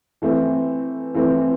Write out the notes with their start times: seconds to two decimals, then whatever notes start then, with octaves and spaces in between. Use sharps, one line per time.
0.22 E3 A3 C4
1.14 E3 A3 C4